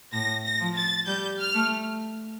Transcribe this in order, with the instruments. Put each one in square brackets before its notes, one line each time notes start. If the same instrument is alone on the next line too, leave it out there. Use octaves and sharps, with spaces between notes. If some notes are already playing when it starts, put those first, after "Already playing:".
[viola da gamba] A2 [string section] A#6
[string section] A#6
[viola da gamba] F3
[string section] A6
[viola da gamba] G3 [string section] G6
[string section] F6
[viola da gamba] A3